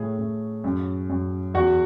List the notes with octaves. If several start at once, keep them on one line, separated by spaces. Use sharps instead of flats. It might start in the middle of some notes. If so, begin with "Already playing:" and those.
Already playing: A2 A3 G#4
A2
F#2
F#2
E2 F#4 F#5